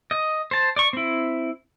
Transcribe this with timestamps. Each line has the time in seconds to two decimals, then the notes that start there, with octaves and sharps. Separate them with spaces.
0.11 D#5
0.51 C5 A5
0.76 D5 C#6
0.93 C4 E4